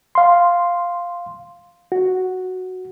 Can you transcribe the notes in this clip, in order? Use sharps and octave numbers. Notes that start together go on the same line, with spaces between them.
F5 C6
F#4